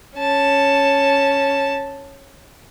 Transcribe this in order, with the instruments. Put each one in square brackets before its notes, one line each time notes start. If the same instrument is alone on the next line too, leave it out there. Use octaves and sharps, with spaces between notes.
[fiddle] C#4 A5